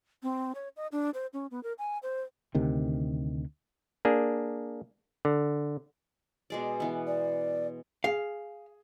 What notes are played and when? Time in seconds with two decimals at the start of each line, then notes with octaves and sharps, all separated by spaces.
0.23 C4
0.55 C#5
0.76 D#5
0.92 D4
1.14 C5
1.33 C#4
1.51 B3
1.63 A#4
1.78 G#5
2.03 C5
2.55 D2 C3 D#3
4.05 A#3 D4 G#4
5.25 D3
6.50 B2 G#3 D5
6.80 E3 B3
7.07 D5
8.04 G#4 F5